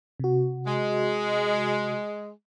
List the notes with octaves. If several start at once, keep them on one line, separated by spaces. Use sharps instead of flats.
C3 F#4
G#3